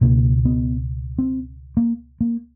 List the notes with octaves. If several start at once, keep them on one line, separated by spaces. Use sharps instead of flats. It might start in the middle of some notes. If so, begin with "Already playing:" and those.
C#2 B2 A#3
B3
C4
A#3
A#3